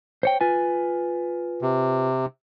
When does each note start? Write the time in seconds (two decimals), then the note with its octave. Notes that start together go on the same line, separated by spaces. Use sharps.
0.23 C5 C#5 G5
0.41 F4 B4 G#5
1.62 C3